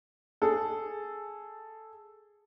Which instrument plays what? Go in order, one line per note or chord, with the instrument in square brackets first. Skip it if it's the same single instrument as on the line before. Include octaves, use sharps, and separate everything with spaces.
[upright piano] G#4 A4